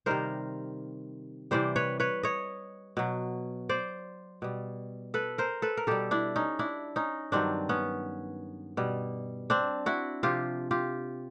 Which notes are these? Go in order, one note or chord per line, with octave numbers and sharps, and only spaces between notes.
C3 D#3 G3 A#4 C5
C3 E3 G3 C5 D5
B4 C#5
B4 C#5
C#5 D#5
B2 F#3
C5 D5
B2 G3
A4 B4
A#4 C5
A4 B4
A#4
B2 G3 G4 A4
D4 E4
C#4 D#4
D4 E4
C#4 D#4
G2 D#3 F#3 C4 D4
B3 C#4
B2 G3
C4 D4
E4 F#4
C3 F3 F4 G4
F4 G4